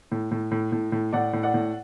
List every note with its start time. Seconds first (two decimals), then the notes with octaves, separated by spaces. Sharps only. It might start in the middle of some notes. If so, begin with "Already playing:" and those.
0.12 A2
0.31 A2
0.51 A2
0.72 A2
0.92 A2
1.13 A2 D5 F#5
1.33 A2
1.43 D5 F#5
1.54 A2